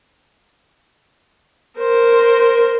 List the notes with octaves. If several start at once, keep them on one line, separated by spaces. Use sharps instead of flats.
A#4 C5